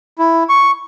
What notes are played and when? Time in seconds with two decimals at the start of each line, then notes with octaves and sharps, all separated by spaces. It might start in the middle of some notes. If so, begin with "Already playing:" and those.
0.19 E4
0.49 C#6